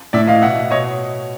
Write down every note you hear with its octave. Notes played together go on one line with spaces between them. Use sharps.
A2 D5 E5
E3 D#5 F5
B2 E5 F#5
B2 C#5 D#5